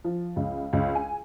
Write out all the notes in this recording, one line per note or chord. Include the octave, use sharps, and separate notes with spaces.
F3
C#2
C#2
G#5